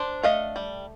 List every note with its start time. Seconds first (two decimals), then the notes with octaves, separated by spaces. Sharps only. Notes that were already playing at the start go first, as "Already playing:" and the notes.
Already playing: D4 C5 D5
0.23 A3 D#5 F5
0.56 G3